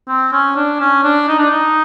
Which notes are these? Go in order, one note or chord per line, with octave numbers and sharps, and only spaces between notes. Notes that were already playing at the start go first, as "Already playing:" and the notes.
C4
C#4
D4
C#4
D4
D#4
D4
D#4